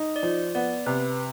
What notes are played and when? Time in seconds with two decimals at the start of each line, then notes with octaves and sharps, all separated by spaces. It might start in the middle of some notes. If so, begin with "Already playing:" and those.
Already playing: D#4
0.16 D5
0.23 F3 C5
0.55 B3 D5
0.86 C3 B4